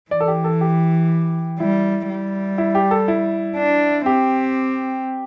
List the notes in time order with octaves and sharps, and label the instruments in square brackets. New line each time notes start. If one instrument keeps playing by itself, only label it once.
[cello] E3 [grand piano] D5
[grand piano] A4
G4
A4
G4
[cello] G3 [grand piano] E4
[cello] G3
[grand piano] E4
G4
A4
E4
[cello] D4
[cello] C4 [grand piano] G4